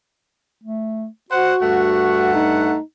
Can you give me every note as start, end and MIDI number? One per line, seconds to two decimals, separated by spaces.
0.63 1.06 57
1.30 2.29 66
1.30 1.54 72
1.30 1.54 78
1.62 2.76 43
1.62 2.76 57
1.62 2.76 78
2.34 2.80 63